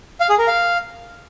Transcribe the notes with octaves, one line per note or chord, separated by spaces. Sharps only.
F5
G#4
A#4
F5